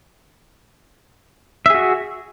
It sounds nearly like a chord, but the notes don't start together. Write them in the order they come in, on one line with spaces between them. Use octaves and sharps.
E5 G#4 F#4